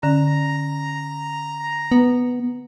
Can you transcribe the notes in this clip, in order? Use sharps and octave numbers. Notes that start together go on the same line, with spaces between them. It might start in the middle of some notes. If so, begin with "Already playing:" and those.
D3 C#4 A#5
B3